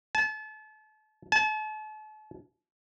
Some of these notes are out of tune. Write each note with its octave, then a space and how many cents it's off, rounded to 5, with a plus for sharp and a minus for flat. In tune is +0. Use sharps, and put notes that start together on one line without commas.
A5 -35
A5 -40